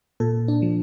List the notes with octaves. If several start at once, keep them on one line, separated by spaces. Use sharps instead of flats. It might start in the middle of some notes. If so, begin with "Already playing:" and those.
A#2 A4
D4
F3